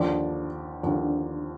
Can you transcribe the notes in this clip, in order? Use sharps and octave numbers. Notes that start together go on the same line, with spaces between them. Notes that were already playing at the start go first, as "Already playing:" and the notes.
Already playing: D#2 D3 F3 D5
D#2 D3 F3